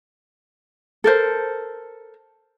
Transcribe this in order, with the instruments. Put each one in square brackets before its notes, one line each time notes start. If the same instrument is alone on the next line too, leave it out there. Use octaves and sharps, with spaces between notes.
[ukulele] A4 A#4 C5